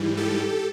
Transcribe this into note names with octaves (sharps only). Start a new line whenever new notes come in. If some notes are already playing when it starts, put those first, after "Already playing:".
Already playing: G#2 E3 G3
G4 A4